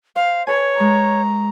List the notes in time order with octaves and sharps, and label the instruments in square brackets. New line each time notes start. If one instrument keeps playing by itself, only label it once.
[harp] C5 [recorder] F5
[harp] A4 B4 G#5 [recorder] C#5
[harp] G#3 C#6 [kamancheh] A#5